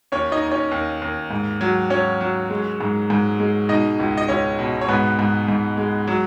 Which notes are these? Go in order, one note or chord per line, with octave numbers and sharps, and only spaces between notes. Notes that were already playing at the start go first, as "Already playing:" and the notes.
D#2 C#4 C#5
D#4 D#5
D#2
C#4 C#5
D#2
D#2
G#2
F#3
F#3 C#4 C#5
F#3
G#3
G#2
G#2
G#3
B2 D#4 D#5
C#2
D#5
C#2 C#4 C#5
B2
C#5
G#2 B3 B4
G#2
G#2
G#3
F#3